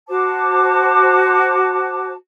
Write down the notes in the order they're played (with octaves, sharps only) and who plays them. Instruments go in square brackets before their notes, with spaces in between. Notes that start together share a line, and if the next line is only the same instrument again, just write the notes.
[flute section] F#4 C5 A5 D6